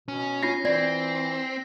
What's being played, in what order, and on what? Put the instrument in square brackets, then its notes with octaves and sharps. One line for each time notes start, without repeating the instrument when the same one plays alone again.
[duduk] B2 [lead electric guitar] C#4
[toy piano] D4 F4 [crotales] A#6 C7
[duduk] E3 [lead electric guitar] C4 [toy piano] D5